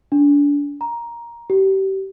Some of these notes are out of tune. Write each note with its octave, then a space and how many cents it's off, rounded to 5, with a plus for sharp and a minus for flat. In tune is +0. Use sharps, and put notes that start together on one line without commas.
D4 -30
A#5 +10
G4 -30